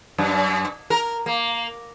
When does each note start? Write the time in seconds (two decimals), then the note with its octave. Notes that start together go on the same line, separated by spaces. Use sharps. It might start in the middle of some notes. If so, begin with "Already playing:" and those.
0.18 F#2
0.90 A#4
1.26 A#3